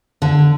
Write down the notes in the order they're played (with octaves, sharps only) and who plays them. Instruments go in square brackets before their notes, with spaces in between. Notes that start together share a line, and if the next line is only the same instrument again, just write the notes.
[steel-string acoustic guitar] D3